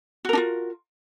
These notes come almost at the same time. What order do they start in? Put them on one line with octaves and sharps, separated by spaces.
F#4 A#4 D4 F4